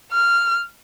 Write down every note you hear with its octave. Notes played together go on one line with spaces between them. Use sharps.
F6